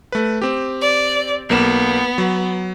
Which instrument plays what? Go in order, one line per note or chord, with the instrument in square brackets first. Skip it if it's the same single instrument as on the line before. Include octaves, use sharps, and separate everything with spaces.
[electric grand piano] A3 B4
C4 G4
[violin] D5
[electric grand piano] B1 A#3 E7 [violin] B3
[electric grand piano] F#3